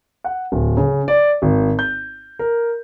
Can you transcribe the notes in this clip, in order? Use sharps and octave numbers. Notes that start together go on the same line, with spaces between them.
F#5
D1
C#3
D5
G#1
G6
A#4